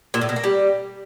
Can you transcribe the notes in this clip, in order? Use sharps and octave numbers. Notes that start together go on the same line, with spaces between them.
A#2
A2
B2
A#3
G3